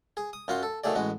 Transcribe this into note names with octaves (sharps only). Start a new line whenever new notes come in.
G#4
D#6
F#2 F4 F#4 C6
A4
D#3 F#3 A3 G#4 D5
A1 G#3 F#4